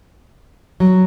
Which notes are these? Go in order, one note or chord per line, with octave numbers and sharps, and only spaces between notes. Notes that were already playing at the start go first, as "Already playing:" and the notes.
F#3